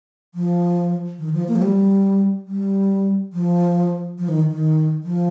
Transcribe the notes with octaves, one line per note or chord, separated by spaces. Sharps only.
F3
D#3
F3
A#3
F3
G3
G3
F3
F3
D#3
D#3
F3